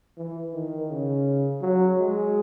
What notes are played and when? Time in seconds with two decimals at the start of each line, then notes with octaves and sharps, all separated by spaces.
0.18 E3
0.54 D#3
0.90 C#3
1.62 F#3
1.99 G#3